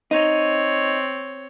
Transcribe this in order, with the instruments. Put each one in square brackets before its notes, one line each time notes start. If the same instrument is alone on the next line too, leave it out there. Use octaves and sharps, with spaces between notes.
[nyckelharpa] C4 C#5 [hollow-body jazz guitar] D#4